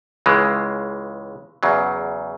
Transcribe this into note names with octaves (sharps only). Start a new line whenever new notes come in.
C#2 C#3 E3 G#3
E2 C#3 F#3